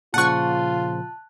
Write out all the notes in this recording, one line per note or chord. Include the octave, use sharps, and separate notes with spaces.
A#2 C#3 F3 F4 F#5 A5 C#6 F#6